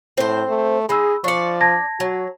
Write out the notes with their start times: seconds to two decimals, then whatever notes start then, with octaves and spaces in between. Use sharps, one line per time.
0.18 A2 C4 C5
0.49 A3
0.89 G#3 D#4 G#4 B5 E6
1.24 F3 D4 D5 C#6 C#7
1.61 A5 G#6 A#6
2.00 F#3 F#4